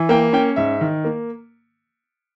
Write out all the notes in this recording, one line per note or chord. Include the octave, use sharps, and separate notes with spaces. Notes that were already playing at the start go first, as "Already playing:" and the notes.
Already playing: E3
A#3 G5
C#4 G5
G#2 E5
D#3
A#3